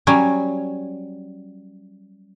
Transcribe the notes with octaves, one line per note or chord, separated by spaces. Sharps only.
F#3 G3 C#4